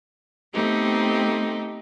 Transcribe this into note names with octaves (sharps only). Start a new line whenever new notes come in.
A3 B3 C4 D#4 G4